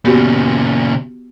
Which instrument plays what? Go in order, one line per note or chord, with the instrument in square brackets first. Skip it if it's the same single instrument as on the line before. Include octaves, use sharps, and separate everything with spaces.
[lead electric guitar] A#2 C#3 [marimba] B3 F#4 G4